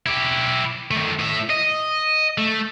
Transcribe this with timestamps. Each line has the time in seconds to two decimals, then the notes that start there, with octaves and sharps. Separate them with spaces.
0.06 E4 G4
0.91 D#3 A3
1.19 A2 E5
1.50 D#5
2.38 A3